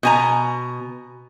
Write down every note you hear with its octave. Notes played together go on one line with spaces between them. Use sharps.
B2 G#5 A#5